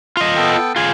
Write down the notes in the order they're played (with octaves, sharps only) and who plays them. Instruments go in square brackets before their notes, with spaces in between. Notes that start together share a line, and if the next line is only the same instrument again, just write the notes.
[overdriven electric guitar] F4 D#5
[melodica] B3 A4 G5
[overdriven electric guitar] F4 G#4